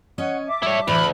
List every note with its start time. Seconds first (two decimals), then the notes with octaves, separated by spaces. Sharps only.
0.18 C#4 C#5 D#5 F#5
0.47 E5 A5 D6
0.63 G3 E4 C#5
0.88 D2 A2 E3 B5